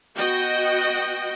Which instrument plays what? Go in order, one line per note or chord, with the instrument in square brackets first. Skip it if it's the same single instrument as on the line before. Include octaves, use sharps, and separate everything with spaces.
[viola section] B3 F#4 D#5 G5